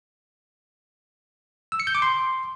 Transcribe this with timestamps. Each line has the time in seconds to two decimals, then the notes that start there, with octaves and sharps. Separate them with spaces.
1.72 E6
1.80 C#7
1.87 G6
1.95 D6
2.02 C6